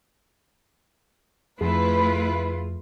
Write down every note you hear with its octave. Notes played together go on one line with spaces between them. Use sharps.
F2 A3 E4 F4 G#4 B4